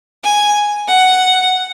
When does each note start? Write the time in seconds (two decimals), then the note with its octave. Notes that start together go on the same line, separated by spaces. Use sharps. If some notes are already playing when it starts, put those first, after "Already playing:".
0.24 G#5
0.88 F#5